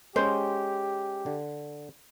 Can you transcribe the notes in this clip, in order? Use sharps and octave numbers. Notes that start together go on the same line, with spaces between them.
G#3 C#4 G4 C5
D3